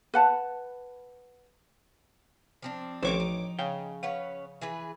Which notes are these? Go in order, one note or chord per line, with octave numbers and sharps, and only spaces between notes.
B4 F#5 A5
F3 C4 D4
A1 D#3 F3 C4 D#4 C5 C#5 D6
D#4
C#3 G5
C#4 B4 C#5 F5 F#5
E3 G#4 B4